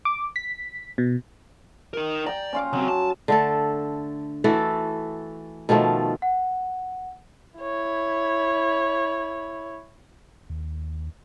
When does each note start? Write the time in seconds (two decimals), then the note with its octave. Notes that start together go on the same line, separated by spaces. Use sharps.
0.05 D6
0.36 B6
0.98 B2
1.93 D#4 A#4
2.26 D5 G5 A#5
2.53 C#4 F4 F5
2.73 C#2 F#3 C4
2.88 A5
3.28 D3 A3 A4
4.44 E3 A3 F#4 A4
5.69 B2 D#3 F3 A3
6.22 F#5
7.59 E4 C#5
10.50 D#2